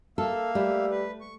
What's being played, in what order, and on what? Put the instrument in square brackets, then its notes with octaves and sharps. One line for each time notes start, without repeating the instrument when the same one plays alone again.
[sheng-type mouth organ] A#3 E5 F5 [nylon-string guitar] A4
[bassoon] G3 [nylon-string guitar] A3
[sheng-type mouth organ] B4
C#6